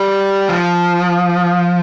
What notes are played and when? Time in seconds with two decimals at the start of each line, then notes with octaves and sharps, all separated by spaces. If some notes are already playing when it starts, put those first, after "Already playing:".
Already playing: G3
0.49 F3